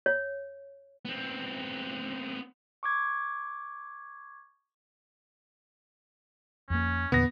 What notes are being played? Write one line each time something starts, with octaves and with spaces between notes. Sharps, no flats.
C#5
B3 C4
C#6 D6 G#6
F2 A#3 C#4
E2 A#2 D3 B3 A#6